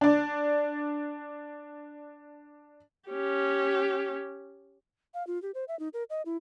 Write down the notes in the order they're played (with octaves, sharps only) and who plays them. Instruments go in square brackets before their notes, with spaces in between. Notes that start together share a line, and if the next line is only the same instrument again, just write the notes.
[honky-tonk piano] D4 D5
[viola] C#4 G4
[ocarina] F5
F4
G4
C5
E5
D#4
A#4
D#5
E4